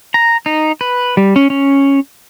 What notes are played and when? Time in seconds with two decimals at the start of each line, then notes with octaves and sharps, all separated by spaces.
0.14 A#5
0.46 D#4
0.81 B4
1.17 G3
1.36 C#4
1.50 C#4